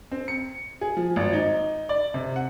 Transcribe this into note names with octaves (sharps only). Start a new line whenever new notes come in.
C4
C#7
G#4
F3
G#1
D#4
D5
C3
F#5